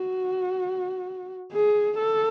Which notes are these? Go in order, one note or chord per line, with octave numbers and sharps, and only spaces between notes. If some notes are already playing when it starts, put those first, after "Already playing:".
Already playing: F#4
G#4
A4